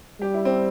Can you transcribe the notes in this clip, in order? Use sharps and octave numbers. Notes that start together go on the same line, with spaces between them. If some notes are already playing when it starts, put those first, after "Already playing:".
G3 G4
E4
C4